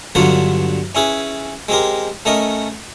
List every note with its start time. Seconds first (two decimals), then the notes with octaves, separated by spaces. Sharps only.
0.15 G2 D3 F#3 B3 F4 F#4
0.95 C#4 E4 G#4 B4
1.69 G#3 C4 G4 A#4
2.26 A3 C#4 A#4 D#5